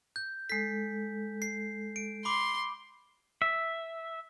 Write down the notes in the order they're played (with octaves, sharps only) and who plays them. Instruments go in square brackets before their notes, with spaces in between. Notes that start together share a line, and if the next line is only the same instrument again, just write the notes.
[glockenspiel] G6
[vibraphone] G#3 A4 [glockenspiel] B6
[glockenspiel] C7
D7
[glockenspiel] B5 D6 [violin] C6
[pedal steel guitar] E5